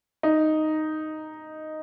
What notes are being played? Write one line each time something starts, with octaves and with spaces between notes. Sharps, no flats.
D#4